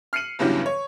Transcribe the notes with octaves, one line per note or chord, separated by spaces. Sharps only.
F6 C7 C#7 D#7 F#7
E2 G2 C#3 E3 F#3 G3
C#5